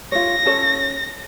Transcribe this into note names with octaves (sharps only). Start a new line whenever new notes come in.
F4 C#5 A#6
C#4 A4 C#5